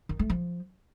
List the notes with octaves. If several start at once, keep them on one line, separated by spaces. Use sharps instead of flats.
D#3
A3
F3